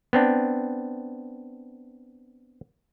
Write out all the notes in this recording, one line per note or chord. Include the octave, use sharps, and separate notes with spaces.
B3 C4 D4